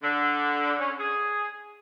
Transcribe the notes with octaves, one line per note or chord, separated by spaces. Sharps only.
D3
C#4
G#4